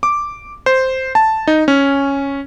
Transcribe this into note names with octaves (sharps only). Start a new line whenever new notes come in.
D6
C5
A5
D#4
C#4